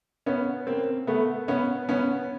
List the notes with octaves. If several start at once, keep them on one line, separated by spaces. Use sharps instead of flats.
B3 C#4
A#3 C4
A3 B3
B3 C#4
B3 C#4